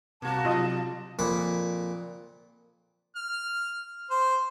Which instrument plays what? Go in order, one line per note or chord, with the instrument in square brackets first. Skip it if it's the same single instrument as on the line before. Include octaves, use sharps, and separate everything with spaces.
[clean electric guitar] C2 C3 [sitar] A#3 F#4 [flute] A5
[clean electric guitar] C3 F#3 [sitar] G3 [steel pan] F4 D#5
[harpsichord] F2 A#2 A#3 F#5 B5
[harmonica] F6
C5